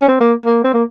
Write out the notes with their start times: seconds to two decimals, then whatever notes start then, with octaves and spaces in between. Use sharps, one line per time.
0.01 C#4
0.08 C4
0.20 A#3
0.45 A#3
0.64 C4
0.74 A#3